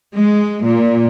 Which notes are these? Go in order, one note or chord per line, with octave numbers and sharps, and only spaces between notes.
G#3
A#2